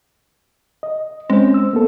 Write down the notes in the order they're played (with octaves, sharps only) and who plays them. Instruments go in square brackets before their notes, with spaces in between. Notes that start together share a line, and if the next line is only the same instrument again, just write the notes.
[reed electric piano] D#5
[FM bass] G#3 [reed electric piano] C4 C#4 C5
[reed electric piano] E6
A#3 B3 A4